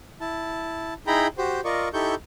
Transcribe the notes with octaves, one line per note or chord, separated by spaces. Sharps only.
E4 A5
D#4 E4 G#4 G5 A#5 B5
F#4 G4 C5
F4 A#4 D5 D#5 C#6
D#4 E4 G4 A4 C#6 G6